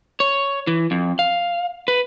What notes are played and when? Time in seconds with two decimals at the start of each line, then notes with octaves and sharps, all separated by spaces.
0.20 C#5
0.67 E3
0.91 F2
1.19 F5
1.88 B4